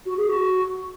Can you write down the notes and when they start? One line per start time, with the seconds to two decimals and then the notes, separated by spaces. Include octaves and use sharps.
0.06 F#4
0.17 G#4
0.29 F#4